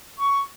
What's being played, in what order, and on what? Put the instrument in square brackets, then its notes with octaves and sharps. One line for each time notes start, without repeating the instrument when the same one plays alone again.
[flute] C#6